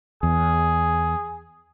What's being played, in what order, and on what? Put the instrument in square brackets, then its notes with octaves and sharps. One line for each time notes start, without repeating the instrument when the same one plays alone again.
[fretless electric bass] E2 [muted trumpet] G#4